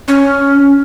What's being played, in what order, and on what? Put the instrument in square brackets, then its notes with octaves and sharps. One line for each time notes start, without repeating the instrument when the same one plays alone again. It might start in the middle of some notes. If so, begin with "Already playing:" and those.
[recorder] C#4